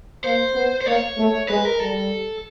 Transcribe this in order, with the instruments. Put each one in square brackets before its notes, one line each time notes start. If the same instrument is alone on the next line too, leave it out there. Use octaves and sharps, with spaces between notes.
[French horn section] A#3 [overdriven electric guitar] C5
[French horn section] B3
[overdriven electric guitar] C5
[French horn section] A#3 [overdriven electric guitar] C#5
[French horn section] A3
[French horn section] G#3 [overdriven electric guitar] B4
[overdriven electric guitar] A#4
[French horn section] G3 [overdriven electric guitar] A4